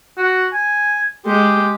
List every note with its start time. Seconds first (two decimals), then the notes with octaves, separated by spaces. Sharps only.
0.17 F#4
0.53 G#5
1.26 G#3 G4